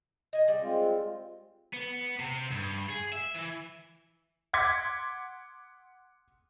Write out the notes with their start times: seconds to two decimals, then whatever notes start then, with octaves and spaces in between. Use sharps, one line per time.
0.33 D#5 G#5
0.48 G3
0.61 G#3 C4 F4
1.74 B3
2.20 C3
2.51 G2
2.89 G#4
3.13 E5
3.35 E3
4.53 F#5 C6 D6 G#6 B6